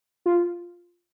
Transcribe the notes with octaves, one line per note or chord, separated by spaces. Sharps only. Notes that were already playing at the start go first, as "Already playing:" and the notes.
F4